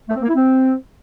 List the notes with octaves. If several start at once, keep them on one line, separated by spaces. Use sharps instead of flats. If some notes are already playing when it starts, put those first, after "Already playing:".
A3
C4
A#3
E4
C4